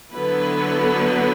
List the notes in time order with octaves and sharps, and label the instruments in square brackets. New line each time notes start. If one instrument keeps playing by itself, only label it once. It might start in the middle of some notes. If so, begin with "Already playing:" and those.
[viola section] D3 F#3 B3 E4 B4